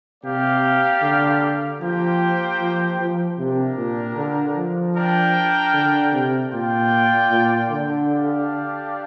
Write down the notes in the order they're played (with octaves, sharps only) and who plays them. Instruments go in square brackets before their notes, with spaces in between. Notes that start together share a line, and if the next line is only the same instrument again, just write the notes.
[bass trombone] C3 [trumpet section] A#3 G4 D5 F5
[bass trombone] D3
[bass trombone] F3 [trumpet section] A#3 G4 C5 G5
[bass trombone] F3
F3
[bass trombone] C3 [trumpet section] A#3 D4 G4 A#4
[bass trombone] A#2
D3
F3
[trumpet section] D4 A#4 G5
[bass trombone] D3
C3
[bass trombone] A#2 [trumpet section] F4 D5 G5
[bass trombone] A#2
D3
[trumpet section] D4 G4 D5 F5